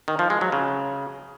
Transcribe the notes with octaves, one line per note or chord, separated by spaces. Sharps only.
D#3
F3
G#3
F#3
C#3